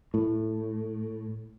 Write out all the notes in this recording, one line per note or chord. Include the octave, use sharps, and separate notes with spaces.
A2